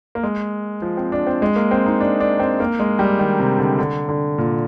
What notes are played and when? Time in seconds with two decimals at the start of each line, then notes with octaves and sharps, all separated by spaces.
0.15 A#3
0.23 G#3
0.82 F3
0.97 C4
1.12 D4
1.27 C4
1.42 G#3
1.56 A#3
1.71 C4
1.86 D#4
2.00 D4
2.20 D4
2.40 C4
2.60 A#3
2.80 G#3
2.99 G3
3.19 D#3
3.40 C3
3.59 D3
3.79 D3
4.09 D3
4.38 A#2